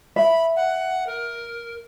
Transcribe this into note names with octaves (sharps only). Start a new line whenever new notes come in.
E5 B5
F#5
A#4